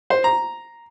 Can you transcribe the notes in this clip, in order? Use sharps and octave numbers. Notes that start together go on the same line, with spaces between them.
C5
A#5